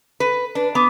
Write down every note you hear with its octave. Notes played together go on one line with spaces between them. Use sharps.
B4
D4 B4
B3 D6